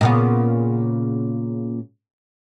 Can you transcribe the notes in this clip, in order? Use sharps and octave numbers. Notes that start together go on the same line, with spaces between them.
A#2 C#3 B3